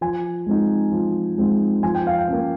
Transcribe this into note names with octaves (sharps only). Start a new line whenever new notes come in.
F3 G#5
G#3 C4 D#4
F3
G#3 C4 D#4
F3 G#5
G5
F5
G5
A#3 C#4